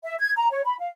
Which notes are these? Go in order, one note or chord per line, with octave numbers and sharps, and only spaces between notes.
E5
G#6
A#5
C#5
B5
F5